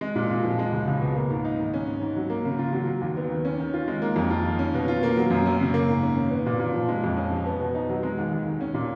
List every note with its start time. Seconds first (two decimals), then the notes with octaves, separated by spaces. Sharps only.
0.01 G#3
0.16 A#2
0.30 A#2
0.44 F3
0.59 G#3
0.72 C#2
0.87 C#2
1.01 B2
1.16 A#3
1.30 G#2
1.45 D#4
1.59 D#3
1.74 C#4
1.87 G#2
2.01 G#2
2.16 F#3
2.30 A#3
2.45 C#3
2.58 F4
2.73 F#3
2.87 F#3
3.01 D#2
3.17 B3
3.30 D#3
3.45 C#4
3.60 D#3
3.74 F4
3.88 G#3
4.02 A#3
4.16 F2
4.30 F4
4.46 D#3
4.59 C#4
4.74 B2
4.88 F4
5.03 A#3
5.17 F#3
5.30 F#2
5.46 C#4
5.60 C#3
5.74 A#3
5.88 G#2
6.03 C#4
6.16 D#3
6.31 B3
6.46 A#2
6.59 A#2
6.74 F3
6.88 G#3
7.04 F2
7.17 C#4
7.31 F3
7.46 B3
7.60 B2
7.75 D#4
7.89 F#3
8.03 G#3
8.18 D#2
8.31 D#2
8.46 D#3
8.61 C#4
8.74 A#2